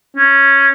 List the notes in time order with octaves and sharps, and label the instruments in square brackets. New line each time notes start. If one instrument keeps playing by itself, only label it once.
[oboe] C#4